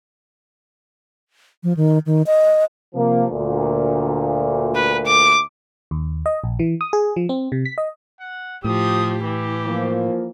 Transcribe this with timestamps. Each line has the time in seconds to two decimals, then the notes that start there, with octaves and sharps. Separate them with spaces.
1.63 F3
1.77 D#3
2.06 D#3
2.26 D#5
2.94 C3 F3 A#3
3.30 D2 A#2
4.75 B4
5.06 D6
5.91 D#2
6.26 D#5
6.44 A#1
6.59 E3
6.81 D#6
6.93 G#4
7.16 F3
7.29 C4
7.52 C3
7.65 B6
7.78 D#5
8.20 F#5
8.64 A2 F3 G4 D#6
9.25 E3 G4
9.67 F3 A#3